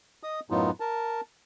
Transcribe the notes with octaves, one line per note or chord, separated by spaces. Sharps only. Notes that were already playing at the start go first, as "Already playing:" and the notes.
D#5 D#6
F#2 A2 F#3 B3 D#4 F4
A#4 A5